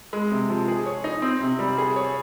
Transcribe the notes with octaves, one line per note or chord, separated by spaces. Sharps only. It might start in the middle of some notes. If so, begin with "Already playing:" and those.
G#3
C3
F3
G#4
C#5
D#4
C4
C3
G3
G#4
C#5